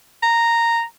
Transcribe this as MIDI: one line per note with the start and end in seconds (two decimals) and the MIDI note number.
0.23 0.83 82